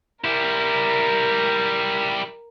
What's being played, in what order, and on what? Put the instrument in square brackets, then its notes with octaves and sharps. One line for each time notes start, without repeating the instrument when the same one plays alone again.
[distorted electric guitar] G3 E4 [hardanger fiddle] A#4